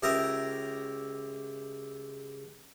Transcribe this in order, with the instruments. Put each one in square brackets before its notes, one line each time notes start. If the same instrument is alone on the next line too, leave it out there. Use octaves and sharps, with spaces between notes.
[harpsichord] C#2 G4 A#4 E5 A#5 D#6